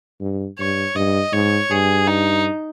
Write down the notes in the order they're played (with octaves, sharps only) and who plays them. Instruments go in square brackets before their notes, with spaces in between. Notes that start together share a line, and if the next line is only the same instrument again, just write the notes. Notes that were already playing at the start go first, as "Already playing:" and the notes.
[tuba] G2
[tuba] G2 [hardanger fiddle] C#5
[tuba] G2 [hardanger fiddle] D#5
[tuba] G#2 [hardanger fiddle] C#5
[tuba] G2 [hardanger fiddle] G#4
[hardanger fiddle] D#4